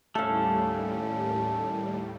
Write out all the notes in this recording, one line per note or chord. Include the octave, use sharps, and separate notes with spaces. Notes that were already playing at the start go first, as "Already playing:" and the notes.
D#2 A2 G3 A3 C#4 A4 F5